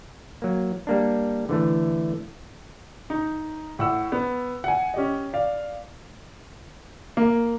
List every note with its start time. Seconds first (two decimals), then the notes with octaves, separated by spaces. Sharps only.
0.42 F#3 A#3
0.87 G3 A#3 D4
1.49 D3 E3 A3
3.10 D#4
3.79 A2 F#5 E6
4.12 B3
4.64 F#5 G#5
4.94 C#4 G4 D#5
5.33 D5 F5
7.17 A#3